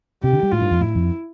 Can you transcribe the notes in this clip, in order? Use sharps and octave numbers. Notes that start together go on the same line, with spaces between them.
C3 G4
D3
G3
A2 F4
G2
F2
A2 E4
F2